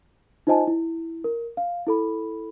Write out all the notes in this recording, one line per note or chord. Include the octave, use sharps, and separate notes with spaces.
D#4 F4 C5 D#5 G#5 A5
E4
A#4
F5
E4 A4 B5